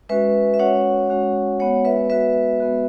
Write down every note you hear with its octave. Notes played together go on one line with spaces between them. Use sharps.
G#3 C#4 F#4 B4 E5
E5
G#3 C#4 F#4 C#5 F#5
G#3 C#4 F#4
G#3 B3 F#4 C#5 F#5
B4 E5
G#3 B3 F#4 B4 E5
G#3 B3 F#4